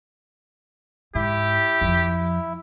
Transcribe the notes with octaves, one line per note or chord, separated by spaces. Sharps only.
G#2 E4 G4
F2 F3